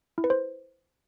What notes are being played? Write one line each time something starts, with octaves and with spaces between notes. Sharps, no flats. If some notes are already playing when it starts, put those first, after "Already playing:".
E4
B4
C5